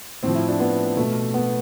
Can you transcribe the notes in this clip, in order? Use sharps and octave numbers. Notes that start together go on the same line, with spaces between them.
A2 F3 C4
E4
D4
B3
B2 A3
B3